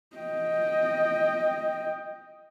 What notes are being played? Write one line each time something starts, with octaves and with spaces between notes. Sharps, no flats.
D#5 G5